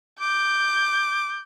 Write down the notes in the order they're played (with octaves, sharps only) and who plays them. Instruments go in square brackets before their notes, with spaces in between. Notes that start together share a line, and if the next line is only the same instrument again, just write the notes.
[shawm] D6 [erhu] G6